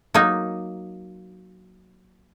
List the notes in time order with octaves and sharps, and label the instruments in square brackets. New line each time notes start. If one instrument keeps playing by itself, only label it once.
[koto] F#3 A#3 D#4